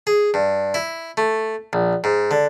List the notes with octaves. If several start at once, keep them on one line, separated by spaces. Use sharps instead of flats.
G#4
G2
E4
A3
A#1
G#2
D3